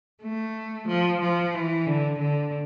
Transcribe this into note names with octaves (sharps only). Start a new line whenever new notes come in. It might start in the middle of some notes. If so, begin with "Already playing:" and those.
A3
F3
F3
E3
D3
D3